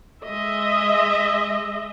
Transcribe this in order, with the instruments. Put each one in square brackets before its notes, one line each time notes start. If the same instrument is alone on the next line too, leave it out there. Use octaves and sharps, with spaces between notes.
[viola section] G#3 D#5 E5